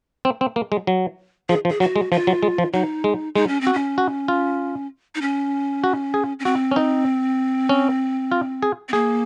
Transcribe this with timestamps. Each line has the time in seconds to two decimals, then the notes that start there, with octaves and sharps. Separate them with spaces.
0.25 C4
0.41 C4
0.56 A#3
0.72 G#3
0.87 F#3
1.49 F3 G#4
1.65 F3
1.69 G#4
1.80 F#3 F#4
1.96 G#3
2.12 F3 F4
2.27 F#3
2.43 G#3
2.58 F3
2.73 F#3 D#4
3.04 G#3
3.35 G#3 D#4
3.48 C#4
3.61 C4
3.67 F#4
3.73 C#4
3.98 F#4
4.28 F4
5.15 D#4
5.22 C#4
5.84 F#4
6.14 G#4
6.39 C#4
6.45 C4 F#4
6.71 C#4
6.76 D#4
7.69 C#4
8.32 F4
8.63 G#4
8.89 C4
8.93 A#3 G#4